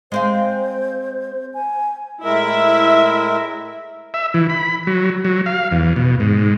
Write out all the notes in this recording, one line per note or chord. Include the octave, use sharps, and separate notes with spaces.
G#3 C4 C5 F5
G#5
A2 G#3 E4 A#4 E5
E5
E3
B5
F#3
F#3
F5
E2
B2
G#2